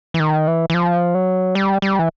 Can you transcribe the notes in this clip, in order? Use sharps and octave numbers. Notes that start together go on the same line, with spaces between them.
E3
D#3
E3
E3
F3
F#3
G3
G3
E3